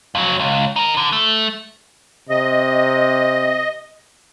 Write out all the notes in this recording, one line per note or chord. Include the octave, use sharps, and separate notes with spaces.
F2 F#3
C#2
D#4 A#4
D3
A3
C3 D#5